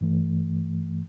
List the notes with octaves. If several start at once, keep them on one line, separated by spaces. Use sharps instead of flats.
G2 E3 A3